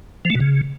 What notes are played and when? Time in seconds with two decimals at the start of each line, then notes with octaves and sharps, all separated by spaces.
0.25 F3
0.30 A3
0.35 B2
0.40 C#3